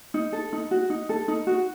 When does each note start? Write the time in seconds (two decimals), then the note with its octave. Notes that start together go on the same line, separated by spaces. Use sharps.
0.14 D#4
0.32 A4
0.53 D#4
0.71 F#4
0.90 D#4
1.09 A4
1.28 D#4
1.47 F#4